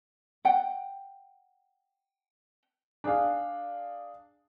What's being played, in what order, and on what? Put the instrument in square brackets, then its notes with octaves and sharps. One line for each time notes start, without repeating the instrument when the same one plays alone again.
[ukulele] F#5 G5
[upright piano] D4 G#4 F5